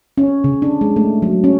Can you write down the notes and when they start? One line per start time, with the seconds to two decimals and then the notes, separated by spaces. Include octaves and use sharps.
0.18 C#4
0.44 C#3
0.62 D4
0.81 G#3
0.96 A3
1.22 F#3
1.44 C#4